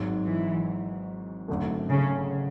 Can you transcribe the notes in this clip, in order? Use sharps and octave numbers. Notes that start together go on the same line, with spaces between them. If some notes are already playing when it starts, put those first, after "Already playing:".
Already playing: G#1 G#2 F#3
E3
G#1 F#2 D3 A3
C#3